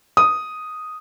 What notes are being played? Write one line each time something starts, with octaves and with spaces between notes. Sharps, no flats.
D#6